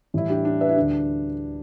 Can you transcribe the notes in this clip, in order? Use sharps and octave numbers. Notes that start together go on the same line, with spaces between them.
A2 E3 G3 E4
D4 G4
D4
B4 E5
E4
D2 D3 G3 D4